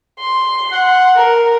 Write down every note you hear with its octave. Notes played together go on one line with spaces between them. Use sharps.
C6
F#5
A#4